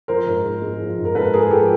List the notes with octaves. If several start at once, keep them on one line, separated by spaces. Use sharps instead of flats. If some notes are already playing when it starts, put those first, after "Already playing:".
F3 A#4 C5
G#2
G#2
G#3
F3
G#2
A#4
G#2 A4 B4
G#3 G#4 A#4
F3 G4 A4